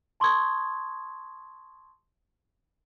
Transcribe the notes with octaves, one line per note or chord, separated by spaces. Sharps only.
A5 C6 C#6 D#6 G#6